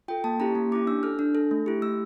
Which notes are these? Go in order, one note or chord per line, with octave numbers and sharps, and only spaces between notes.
F4 A4 G5
A#3 A5
C#4 E4 G4 A#5
A#3
C#4 E4 G4 D6
D4 E6
A4 F6
D4
A4
A3
E4 G4
A3 E6